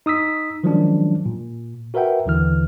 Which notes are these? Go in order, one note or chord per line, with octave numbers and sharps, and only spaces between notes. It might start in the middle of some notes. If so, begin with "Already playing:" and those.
D#4 D#6 E6 B6
D#3 F3 F#3 G#3 C#4 D4
A#2
F#4 A#4 B4 E5 F#5 G5
D#2 D3 E3 F6